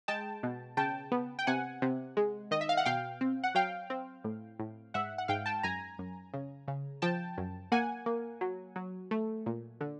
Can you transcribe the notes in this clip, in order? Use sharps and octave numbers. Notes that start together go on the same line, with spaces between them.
G#3 G5 A5
B2
C#3 G5 A5
B3
G5
C3 F#5 G#5
C3
G#3
D#3 D#5
E5
F5
F#5
B2 F5 G5
C4
F#5
F#3 F5 G5
C4
A2
A2
G#2 E5 F#5
F#5
G#2 F5 G5
G5 A5
F#2 G#5 A#5
F#2
C#3
C#3
F3 G5 A5
F#2
A#3 F#5 G#5
A#3
F#3
F#3
A3
A#2
D3